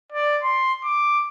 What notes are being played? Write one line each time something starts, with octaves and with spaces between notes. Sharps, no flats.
D5
C6
D6